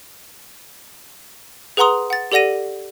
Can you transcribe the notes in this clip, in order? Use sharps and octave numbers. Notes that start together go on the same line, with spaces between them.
G#4 B4 F#5 A#5 C6 D#6
F#5 A6
G4 A4 D5 F#5 A#6 D#7